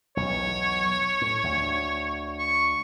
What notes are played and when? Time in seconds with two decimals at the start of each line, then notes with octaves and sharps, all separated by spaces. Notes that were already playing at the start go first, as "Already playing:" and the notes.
0.17 B1 E2 C#5
1.21 A2
1.43 D2
2.39 C#6